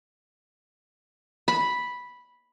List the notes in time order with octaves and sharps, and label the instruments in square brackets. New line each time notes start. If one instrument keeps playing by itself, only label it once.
[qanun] B5